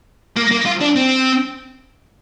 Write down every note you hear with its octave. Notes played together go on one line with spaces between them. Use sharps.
A#3
A#3
F4
D4
C4